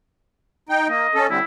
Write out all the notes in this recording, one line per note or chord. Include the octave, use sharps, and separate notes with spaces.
D#4 G5
A#3 D#5
C#4 A4
D3 G3 C4 E4